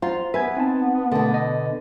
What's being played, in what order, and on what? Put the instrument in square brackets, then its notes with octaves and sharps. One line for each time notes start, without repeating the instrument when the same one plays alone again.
[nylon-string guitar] F4 [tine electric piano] C5 F#5 A#5
[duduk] B3 [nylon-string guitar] B4 [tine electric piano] E5 G#5 G#6
[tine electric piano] C4 D#4 A5
[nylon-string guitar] B2 D3 [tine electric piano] A3 A5
[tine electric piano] D#5